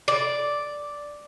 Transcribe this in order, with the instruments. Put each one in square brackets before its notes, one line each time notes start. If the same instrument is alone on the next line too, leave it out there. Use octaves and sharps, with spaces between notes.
[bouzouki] D5